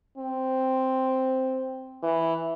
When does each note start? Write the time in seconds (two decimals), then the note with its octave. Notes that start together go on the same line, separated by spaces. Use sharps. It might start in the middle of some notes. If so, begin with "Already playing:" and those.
0.17 C4
2.03 E3